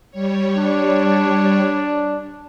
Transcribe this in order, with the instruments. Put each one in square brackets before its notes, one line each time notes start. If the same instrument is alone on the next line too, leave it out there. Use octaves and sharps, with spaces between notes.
[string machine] G3 C#5
[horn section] D4